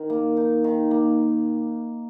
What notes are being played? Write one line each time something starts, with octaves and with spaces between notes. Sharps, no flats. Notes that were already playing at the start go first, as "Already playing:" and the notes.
Already playing: D#3
A#3
D#4
D#3
A#3